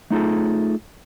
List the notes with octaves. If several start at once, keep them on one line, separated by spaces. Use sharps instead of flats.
A3 D#4 F4 G#4 A4